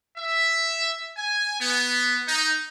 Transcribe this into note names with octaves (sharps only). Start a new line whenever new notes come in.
E5
G#5
B3
D#4